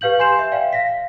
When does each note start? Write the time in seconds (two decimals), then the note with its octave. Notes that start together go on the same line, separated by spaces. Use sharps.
0.01 G4 B4 F5 G6 F#7
0.19 G#5 C6 G6 C7 E7
0.39 E5
0.52 D5 F5 G5
0.73 F5 A#6 B6